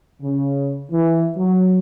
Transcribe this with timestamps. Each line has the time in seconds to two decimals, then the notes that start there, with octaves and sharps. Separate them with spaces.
0.22 C#3
0.91 E3
1.37 F#3